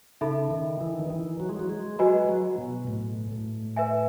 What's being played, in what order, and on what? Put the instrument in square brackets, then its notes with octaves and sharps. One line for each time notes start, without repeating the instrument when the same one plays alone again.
[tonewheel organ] C#3 [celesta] D#4 A4 E5 B5
[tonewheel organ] D#3
E3
D#3
E3
F#3
G#3
F#3
G#3
[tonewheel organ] F#3 [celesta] F#4 B4 D#5 G#5 B5
[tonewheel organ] F#3
B2
A2
A2
[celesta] B4 E5 G#5